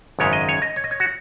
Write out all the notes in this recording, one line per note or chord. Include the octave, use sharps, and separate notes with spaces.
G#1 F#2 C#3 G#3 C#5
D#5
C#5
D#5
C#5
D#5
C#5
F#4